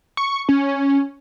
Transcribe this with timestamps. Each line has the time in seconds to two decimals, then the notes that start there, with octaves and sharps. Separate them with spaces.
0.17 C#6
0.49 C#4